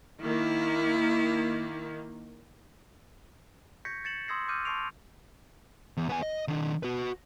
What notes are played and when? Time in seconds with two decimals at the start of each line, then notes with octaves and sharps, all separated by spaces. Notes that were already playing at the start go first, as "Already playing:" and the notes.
0.23 D#3 A#3 E4
3.85 C#6 G6 G#6 A#6 B6 C#7
4.04 G#6 A6 C#7 E7 F#7
4.28 C6 D#6 E6 G#6 A#6 C7
4.48 D6 E6 F6 G6 C7 D#7
4.65 A5 C6 C#6 C7 D7 F7
5.97 E2
6.09 B3 G#5
6.23 D#5
6.48 D#3 D4
6.83 F#4 B4